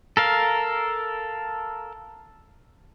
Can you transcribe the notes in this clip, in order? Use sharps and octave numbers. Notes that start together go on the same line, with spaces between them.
A4 A#4 F5